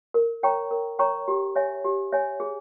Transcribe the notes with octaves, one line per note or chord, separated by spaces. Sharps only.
A#4
C#5 G5 A#5 C#6
A#4
C#5 G5 A#5 C#6
G4
C#5 E5 G#5
G4
C#5 E5 G#5
G#4